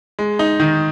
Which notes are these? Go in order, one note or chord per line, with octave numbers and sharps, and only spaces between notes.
G#3
D#4
D#3